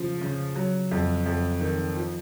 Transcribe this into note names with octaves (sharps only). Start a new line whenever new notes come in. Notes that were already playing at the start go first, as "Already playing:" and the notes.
Already playing: C#3 F3
C#3
F#3
F2
F2
D#3
F3